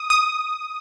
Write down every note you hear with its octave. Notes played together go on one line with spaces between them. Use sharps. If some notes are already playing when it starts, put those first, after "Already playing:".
Already playing: D#6
D#6